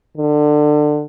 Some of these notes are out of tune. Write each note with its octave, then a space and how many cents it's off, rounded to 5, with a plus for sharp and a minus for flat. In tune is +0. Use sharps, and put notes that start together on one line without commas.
D3 +25